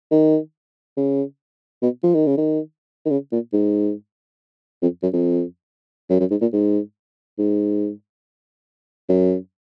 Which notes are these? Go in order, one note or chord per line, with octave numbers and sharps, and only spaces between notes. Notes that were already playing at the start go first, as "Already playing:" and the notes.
D#3
C#3
B2
F3
D#3
C#3
D#3
D#3
C#3
A#2
G#2
F2
F#2
F2
F#2
F#2
G#2
A#2
G#2
G#2
F#2